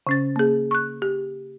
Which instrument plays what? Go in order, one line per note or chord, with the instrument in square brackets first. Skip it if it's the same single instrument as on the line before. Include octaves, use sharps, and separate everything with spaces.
[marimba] C#3 C#4 A6
A#3 G#4
C#6 F#6
G4